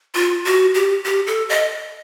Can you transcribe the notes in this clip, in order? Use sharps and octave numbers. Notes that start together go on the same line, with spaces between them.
F4
F#4
G4
G4
A4
D#5